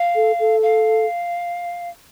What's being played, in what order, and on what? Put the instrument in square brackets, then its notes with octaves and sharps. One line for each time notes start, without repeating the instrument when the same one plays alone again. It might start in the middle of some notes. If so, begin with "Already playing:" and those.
Already playing: [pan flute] F5
[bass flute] A4
A4
[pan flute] F5